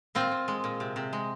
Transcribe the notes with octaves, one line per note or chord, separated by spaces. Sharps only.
A#2 C4 F4
A#2
G#3
A#2
C3
C3
G#3